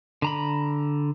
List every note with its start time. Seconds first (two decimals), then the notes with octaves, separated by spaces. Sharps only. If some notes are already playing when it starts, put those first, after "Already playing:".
0.22 D3 A#5 B5